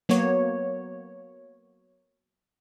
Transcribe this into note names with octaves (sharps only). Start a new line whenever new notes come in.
F#3 A#3 B3 C#5